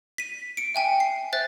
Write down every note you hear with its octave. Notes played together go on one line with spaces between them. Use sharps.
B6 D#7
C#7 D7
E5 G5 G#5
C7
C5 E5 F#6 A6